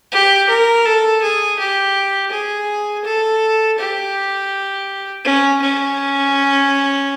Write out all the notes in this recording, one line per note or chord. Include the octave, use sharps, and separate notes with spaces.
G4
A#4
A4
G#4
G4
G#4
A4
G4
C#4
C#4